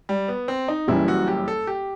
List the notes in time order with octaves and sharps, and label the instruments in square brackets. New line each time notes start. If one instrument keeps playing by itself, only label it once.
[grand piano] G3
B3
C4
D#4
[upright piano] F#1 F#2 E3 G3 [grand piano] E4
[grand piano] F#4
G4
A4
G4